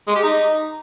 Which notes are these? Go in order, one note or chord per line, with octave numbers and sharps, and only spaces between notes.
G#3
G4
D#4